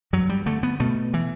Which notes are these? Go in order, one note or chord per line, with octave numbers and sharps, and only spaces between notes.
G2 F#3
G3
D3 A3
B3
B2 A3
E3